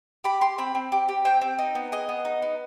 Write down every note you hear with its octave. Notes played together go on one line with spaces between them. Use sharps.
G4 B5
G4 C6
C4 B5
C4
G4
G4
C4 G5
C4
D#4
B3
G#4 D#5
B3
D#4
B3